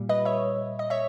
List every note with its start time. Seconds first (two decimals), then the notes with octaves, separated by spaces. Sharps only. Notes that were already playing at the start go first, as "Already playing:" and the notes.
Already playing: A#2 G3
0.09 B4 D#5
0.25 C#5 E5
0.79 D#5
0.90 C#5 E5